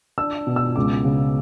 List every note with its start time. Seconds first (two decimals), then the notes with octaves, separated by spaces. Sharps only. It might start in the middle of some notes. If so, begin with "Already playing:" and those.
0.18 D4 E6
0.47 B2
0.56 E6
0.76 C#2 D6
1.05 C#3